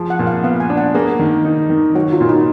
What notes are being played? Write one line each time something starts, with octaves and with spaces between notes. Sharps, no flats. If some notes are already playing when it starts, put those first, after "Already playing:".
Already playing: F3 G#4
F#5
A#2
F5
B3 F5
G#5
D4
F#5
A#3 G#4
D#3
D#4
D#3
F#3 F#4
F4
A#2
D#4